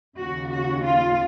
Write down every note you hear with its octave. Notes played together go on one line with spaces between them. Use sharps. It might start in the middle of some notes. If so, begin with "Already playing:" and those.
D#2 C#3 F#4
F#4
F4